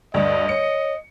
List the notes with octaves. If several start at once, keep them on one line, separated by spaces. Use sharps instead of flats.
D2 G2 D5 D#5
C#5 C#7